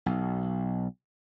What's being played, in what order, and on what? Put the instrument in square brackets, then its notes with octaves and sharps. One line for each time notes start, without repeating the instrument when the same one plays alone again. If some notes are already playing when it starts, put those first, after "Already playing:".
[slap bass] B1